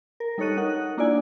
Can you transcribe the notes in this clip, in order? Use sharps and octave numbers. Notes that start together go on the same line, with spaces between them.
A#4
G3 D#4 A4 C#5 F#6 D#7
D#4 A#4 F#5 F#6
A#3 D4 E4 F4 D5 G#5